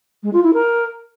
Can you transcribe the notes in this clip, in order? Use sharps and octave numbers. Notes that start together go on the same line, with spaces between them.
G#3
F4
E4
A#4